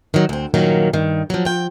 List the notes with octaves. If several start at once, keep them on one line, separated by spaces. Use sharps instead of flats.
D#3 F#3
D2 C4
G2 A#2 D#3 F#3 A#3 C#4
G2 D#3
F3 F#3
F3 G5